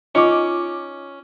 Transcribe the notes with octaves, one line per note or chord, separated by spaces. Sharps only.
C#4 D#4 F4 D6